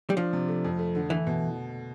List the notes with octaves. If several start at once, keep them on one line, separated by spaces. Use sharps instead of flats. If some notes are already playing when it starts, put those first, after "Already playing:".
G3
F3 D4
C3
A3
F2
A3
D3
E3 A3
B2